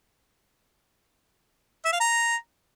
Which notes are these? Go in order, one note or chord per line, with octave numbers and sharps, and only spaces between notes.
E5
F5
A#5